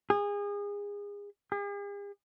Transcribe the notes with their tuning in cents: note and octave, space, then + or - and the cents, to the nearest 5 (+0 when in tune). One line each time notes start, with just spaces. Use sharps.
G#4 -30
G#4 -45